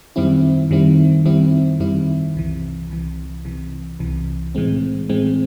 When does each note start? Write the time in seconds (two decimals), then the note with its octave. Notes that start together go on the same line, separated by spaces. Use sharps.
0.16 F#2 D#3 G3 C4 E4
0.70 F#2 D#3 G3 C4 E4
1.25 F#2 D#3 G3 C4 E4
1.80 F#2 D#3 G3 C4 E4
2.35 C2 C3 E3
2.90 C2 C3 E3
3.45 C2 C3 E3
3.99 C2 C3 E3
4.55 A2 E3 G#3 C4
5.09 A2 E3 G#3 C4